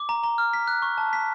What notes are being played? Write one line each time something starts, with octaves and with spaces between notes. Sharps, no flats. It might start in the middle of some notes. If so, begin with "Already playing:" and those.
Already playing: D6
A#5
A#5
F6
B6
F#6
C#6
A5
B6